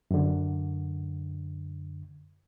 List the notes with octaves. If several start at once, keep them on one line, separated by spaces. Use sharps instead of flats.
F#2 D3